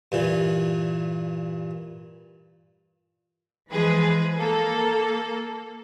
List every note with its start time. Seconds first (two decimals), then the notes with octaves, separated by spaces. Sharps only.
0.12 G2 A#2 E3
3.71 E3 F3 G#3 G#4 B4
4.37 A#3 A4